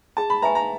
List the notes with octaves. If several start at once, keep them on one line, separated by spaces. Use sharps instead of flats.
G#4 A5
B5
B4 E5 G#5 A#5 C#6
A#5